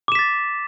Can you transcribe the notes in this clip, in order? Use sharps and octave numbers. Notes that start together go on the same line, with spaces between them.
D6 A6 B6 E7